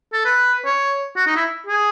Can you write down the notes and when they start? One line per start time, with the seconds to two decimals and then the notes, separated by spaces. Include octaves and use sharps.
0.13 A4
0.25 B4
0.65 C#5
1.17 F#4
1.26 D#4
1.36 E4
1.67 G#4